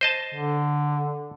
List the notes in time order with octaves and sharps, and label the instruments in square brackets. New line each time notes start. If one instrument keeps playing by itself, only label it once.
[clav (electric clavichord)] C5 D#5 A5
[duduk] D3